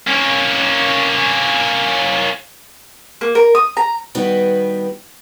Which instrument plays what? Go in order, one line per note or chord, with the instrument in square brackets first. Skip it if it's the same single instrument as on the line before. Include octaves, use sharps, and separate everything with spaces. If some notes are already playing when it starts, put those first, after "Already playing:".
[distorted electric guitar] A#3 C#4
[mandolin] A#3
A#4
D#6
A#5
[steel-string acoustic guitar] D#3 G3 B3 F#4 B4